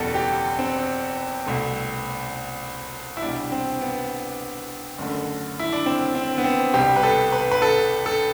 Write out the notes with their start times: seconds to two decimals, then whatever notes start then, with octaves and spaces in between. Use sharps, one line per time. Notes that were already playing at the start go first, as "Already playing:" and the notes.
Already playing: F#1 E2 B2 G3 A4
0.15 G4
0.59 C4
1.46 C2 B2 A3
3.17 E4
3.22 C2 B2 G3 D4
3.52 C4
3.81 B3
4.98 F#1 F#2 D3 A3
5.59 E4
5.72 D4
5.86 C4
6.15 C4
6.38 B3
6.44 C4
6.74 C2 B2 G3 G4
6.96 B4
7.03 A4
7.32 B4
7.51 B4
7.62 A4
8.06 A4